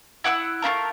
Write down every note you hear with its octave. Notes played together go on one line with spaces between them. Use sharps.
E4 F#5 D#6 E6
A3 C4 F4 A#4